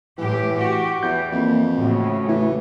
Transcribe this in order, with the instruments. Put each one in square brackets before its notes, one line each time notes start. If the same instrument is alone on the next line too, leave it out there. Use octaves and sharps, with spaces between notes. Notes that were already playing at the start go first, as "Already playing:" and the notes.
[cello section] A2 G4 [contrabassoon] E3
[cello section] F#4 G4
[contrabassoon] E2 [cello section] E3 [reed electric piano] G6
[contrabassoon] F2 [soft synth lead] A#3
[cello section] A2 C#3 [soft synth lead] F#4
[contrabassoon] E3 [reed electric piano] A3 E4